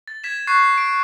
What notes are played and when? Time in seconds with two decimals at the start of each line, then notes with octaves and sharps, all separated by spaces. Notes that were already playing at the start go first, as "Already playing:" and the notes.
0.08 A6
0.24 G#6 B6 E7
0.47 C#6 F#6 A6 C7
0.78 D7